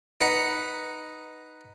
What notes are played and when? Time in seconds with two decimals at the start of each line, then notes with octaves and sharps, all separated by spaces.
0.21 D#4 B4 F#5 A#5